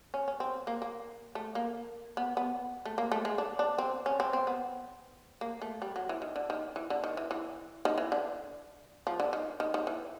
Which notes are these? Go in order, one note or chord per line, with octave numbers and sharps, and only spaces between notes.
C#4
C#4
C4
A#3
A#3
A3
A#3
B3
B3
A3
A#3
A3
G#3
D4
D4
C4
C#4
C4
C4
B3
A#3
A3
G3
F#3
E3
D#3
D3
D#3
E3
D3
D#3
E3
E3
D#3
E3
D3
F3
D3
D#3
D#3
D#3
E3